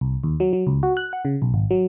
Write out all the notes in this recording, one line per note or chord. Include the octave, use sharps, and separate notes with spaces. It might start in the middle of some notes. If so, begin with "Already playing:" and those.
C2
D#2
F#3
F#3
C#2
F#4
F#6
F#5
C#3
B1
G#1
F#3